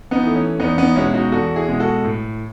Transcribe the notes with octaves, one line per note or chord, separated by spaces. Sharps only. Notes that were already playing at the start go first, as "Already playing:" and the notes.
B3 D#4
E3 A3
C#4
E2 B3 D#4
B3 D#4
B2 G#3 C#4 E4
D#4 F#4
E2 F#4 A4
E4 G#4
B2 G#3
F#4 A4
A2